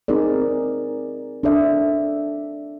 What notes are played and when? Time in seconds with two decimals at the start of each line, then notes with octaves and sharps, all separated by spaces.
0.08 C4 D#4 G#4 A#4 D5
1.43 D4 A4 D5 E5